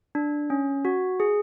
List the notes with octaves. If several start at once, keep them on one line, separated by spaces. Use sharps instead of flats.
D4
C#4
F#4
G#4